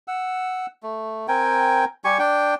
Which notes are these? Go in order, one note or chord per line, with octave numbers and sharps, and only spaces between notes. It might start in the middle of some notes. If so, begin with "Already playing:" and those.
F#5 E6
A3
C4 A#4 G5 G#5
G3 G4 G#5 C#6
D4 G5